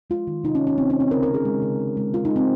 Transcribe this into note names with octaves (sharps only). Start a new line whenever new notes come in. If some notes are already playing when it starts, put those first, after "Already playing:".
G#3 F4
D#3
C3 D#4
C#4
C3
C#4
C3 C4
C#4
D#3
C4
C#3 A#4
A#4
C4
G#4
G#3
C#3
C#3
G#3
C4 F4
D#4
G#3
C4